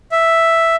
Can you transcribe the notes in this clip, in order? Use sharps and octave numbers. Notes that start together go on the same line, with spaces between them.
E5